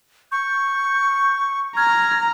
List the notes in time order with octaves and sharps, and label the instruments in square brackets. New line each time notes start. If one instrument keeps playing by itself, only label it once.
[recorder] C#6 [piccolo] G6
[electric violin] A#5 [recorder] F6 [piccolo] G#6